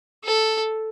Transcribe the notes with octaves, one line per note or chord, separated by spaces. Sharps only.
A4